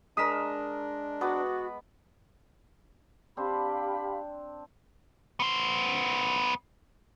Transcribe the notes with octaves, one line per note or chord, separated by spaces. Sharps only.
G#3 D4 A#4 D#6 B6 E7
B3 F#4 B4 D6
C4 D4 G4 C5 F5 B5
B3 C5